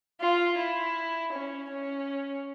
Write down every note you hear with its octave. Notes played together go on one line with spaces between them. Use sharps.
F4
E4
C#4
C#4